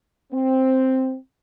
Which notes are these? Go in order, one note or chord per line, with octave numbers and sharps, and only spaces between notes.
C4